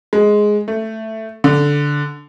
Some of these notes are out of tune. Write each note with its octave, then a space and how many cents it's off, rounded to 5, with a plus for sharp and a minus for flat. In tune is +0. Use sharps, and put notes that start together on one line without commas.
G#3 +5
A3 +5
D3 -10